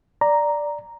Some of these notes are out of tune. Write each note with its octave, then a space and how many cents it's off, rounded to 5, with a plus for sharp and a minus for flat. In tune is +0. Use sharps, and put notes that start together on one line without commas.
D5 +0 A#5 +0